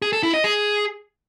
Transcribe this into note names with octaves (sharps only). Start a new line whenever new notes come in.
G#4
A4
E4
D#5
G#4